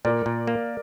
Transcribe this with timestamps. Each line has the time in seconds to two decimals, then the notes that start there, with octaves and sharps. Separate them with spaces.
0.05 A#2 A#4 D5
0.26 A#2
0.47 A#3